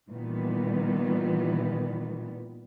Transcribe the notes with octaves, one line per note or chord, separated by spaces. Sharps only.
A#2 D#3 E3 G3 B3